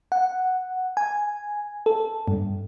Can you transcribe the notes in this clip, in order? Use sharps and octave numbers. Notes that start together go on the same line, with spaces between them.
F#5
G#5
A4
G2